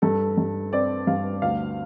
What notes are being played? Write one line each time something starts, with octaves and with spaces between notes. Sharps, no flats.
G2 A4
G2
C4 D5
G2 F5
D2 F5